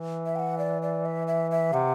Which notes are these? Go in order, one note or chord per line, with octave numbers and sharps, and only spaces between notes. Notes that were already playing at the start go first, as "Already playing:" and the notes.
Already playing: E3
E5
G5
F#5
D5
D5
E5
E5
E5
C3 F#5